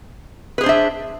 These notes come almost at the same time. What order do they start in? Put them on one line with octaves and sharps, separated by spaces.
B4 G#4 C5 D4 E5